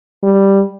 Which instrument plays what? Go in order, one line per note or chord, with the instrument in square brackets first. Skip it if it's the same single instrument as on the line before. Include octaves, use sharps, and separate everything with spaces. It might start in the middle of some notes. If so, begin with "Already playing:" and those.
[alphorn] G3